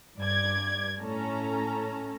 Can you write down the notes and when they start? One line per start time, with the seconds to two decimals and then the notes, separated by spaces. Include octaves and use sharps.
0.18 G2 D5 G#6
1.01 A2 C#4 A4 A#5